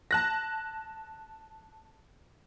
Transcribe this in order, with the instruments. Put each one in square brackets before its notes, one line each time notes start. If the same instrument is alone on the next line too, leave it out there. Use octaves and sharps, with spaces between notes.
[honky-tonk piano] A5 F#6 A#6